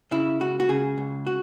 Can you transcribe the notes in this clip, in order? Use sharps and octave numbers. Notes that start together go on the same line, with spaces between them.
C#3 E4
C#2 F#4
F#4
C#3 G#4
C#2
F#4